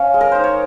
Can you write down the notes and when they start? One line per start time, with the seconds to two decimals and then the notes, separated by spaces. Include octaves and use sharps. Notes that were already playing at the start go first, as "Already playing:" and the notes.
Already playing: C#4 F5
0.14 G#3
0.21 A#4
0.32 D#4 C5
0.44 C#5